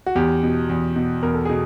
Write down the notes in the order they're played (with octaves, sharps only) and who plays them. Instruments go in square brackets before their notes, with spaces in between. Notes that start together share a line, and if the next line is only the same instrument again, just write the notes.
[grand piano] F#4
E2 G4
B2
E2
B2
E2 A#4
A4
B2 G#4